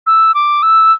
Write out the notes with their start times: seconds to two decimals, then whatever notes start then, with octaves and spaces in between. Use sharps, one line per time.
0.07 E6
0.35 D6
0.63 E6